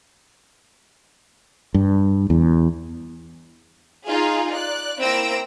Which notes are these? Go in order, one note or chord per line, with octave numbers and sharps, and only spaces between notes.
G2
E2
D#4 F4 G#4 F5
D5 F#6
A#3 C4 E4 E6 A#6 D7